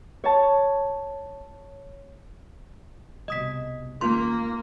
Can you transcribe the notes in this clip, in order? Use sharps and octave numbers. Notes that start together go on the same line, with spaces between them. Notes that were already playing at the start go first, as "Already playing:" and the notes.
C#5 A5
C2 B2 D#5 D#6 B6
D#1 A#3 D#4 F4 C6